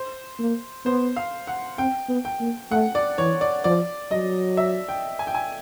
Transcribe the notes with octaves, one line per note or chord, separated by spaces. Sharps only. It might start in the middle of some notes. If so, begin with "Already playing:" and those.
Already playing: C5
A#3
B3 C5
F5
F#5
C4 G5
B3
G5
A#3
A3 F#5
D5
E3 C#5
D5
F3 D5
F#3 D#5
E5
G5
G#5
G5
G#5